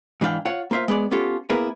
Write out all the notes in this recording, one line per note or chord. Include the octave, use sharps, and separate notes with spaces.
G#2 E3 D4 F#4 F5 G5
F4 C#5 F5 F#5
A#3 F4 C5 E5 F5
G#3 B3 G#4 D5
B3 C#4 F4 G4 A4
A#3 B3 E4 G#4 A#4 B4